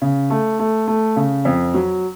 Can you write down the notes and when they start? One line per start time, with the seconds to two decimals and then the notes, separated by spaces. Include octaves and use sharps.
0.02 C#3
0.30 A3
0.59 A3
0.88 A3
1.16 C#3
1.45 F2
1.74 F#3